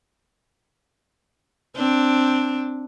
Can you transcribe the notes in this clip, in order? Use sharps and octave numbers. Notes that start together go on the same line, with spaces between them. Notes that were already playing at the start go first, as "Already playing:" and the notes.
C4 D4